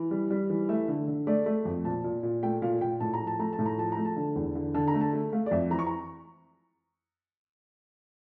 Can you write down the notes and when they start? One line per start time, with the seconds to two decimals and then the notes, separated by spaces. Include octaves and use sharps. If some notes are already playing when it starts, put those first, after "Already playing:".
Already playing: E3
0.11 G3
0.30 G3
0.50 E3
0.69 A3 E5
0.88 D3
1.08 D3
1.27 A3 D5
1.46 A3
1.65 F2
1.85 A#2 A5
2.04 A#2
2.23 A#2
2.43 A3 G5
2.62 A#2 F5
2.81 A#2 G5
3.00 A2 A5
3.14 A#5
3.21 F3
3.27 A5
3.39 A3 A#5
3.53 A5
3.59 A2
3.66 A#5
3.77 F3 A5
3.92 A3 A#5
4.05 A5
4.16 D3
4.36 E2
4.55 D3
4.74 D3 A5
4.88 A#5
4.94 A3
5.01 A5
5.13 A3
5.33 A3 F5
5.46 D5
5.51 F2 E5
5.70 E3 A#5
5.79 C#6
5.87 A#5